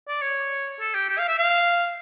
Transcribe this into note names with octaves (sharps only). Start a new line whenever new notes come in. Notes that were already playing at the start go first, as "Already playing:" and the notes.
D5
C#5
A4
G4
G4
F5
E5
F5